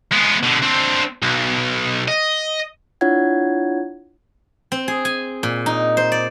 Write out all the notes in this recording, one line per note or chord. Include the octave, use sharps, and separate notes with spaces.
G#3 B3
B2 D3
C4 D4
B1
D#5
D4 E4 F4 C#5 F#5 G#6
C4
G#4
G#5
A#2
D#4
C5
D5